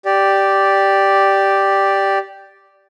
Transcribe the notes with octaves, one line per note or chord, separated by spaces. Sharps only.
G4 D5